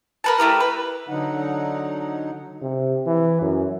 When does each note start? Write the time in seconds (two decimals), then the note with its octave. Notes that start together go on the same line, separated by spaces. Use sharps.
0.24 A#4 B4 A5
0.39 A3 E4 G4 A#4
0.60 B4
1.08 D3 F#3 D#4 F#5
2.62 C3
3.06 E3
3.41 F#2